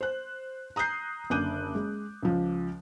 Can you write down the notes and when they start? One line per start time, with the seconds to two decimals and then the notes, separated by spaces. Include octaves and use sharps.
0.01 C5 F#6
0.76 A#5 D#6 F#6 G6 C7
1.30 F#1 D3 D6 F#6 G6 D#7
1.75 G#3
2.23 C#2 F3